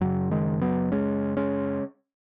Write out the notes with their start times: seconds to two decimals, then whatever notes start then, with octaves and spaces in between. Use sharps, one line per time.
0.01 F#2 C#3 F#3
0.31 D#3 G#3
0.61 F#3 B3
0.92 G#3 C#4
1.37 G#3 C#4